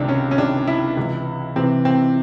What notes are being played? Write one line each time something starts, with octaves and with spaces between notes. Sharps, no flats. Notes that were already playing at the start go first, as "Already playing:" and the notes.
Already playing: C#2 C3 D#3 D4
C#4
C#4
C#2 C3 D#3 D4
E4
C#2 C3 E3
C#2 C3 E3 C4
C4